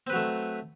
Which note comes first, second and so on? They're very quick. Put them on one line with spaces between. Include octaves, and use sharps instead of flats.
C4 B4 F#3 A3